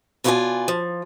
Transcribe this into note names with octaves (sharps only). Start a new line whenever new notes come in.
B2 E4 F4 G#4 D5 G#5
F3